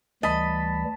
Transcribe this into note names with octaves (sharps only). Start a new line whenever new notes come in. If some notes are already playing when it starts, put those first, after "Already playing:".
D2 E3 G3 D#5 A5 B5